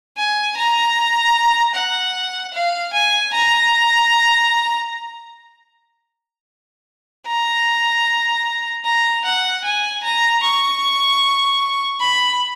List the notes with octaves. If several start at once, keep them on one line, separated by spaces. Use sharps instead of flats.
G#5
A#5
F#5
F5
G#5
A#5
A#5
A#5
F#5
G#5
A#5
C#6
B5